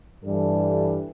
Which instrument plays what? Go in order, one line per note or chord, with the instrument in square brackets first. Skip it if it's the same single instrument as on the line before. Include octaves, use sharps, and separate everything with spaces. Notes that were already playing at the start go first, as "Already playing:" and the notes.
[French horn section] G2 E3 G3 D4 A4